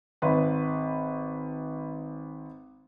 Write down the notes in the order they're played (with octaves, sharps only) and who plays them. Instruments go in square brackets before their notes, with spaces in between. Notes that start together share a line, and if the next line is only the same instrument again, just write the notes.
[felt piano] G#1 B4 C6